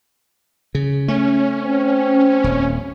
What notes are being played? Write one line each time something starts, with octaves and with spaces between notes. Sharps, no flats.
C#3
A3 C#4
C4
D#1